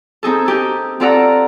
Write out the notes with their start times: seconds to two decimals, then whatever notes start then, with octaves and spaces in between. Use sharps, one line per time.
0.23 C4 D#4 G#4 A4
0.46 D#4 G4 A4
1.00 C4 F4 A4 D5 F#5 A#5